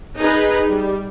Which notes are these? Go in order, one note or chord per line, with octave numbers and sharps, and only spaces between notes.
D#4 G#4 B4
G3